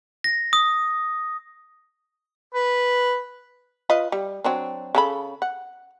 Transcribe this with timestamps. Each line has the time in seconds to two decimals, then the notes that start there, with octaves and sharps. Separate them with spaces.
0.24 A#6
0.53 D#6
2.54 B4
3.90 F4 B4 D#5
4.12 G3
4.44 F#3 C4 D4
4.95 C#3 A4 B5
5.42 F#5